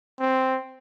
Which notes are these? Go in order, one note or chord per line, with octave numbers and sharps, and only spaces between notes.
C4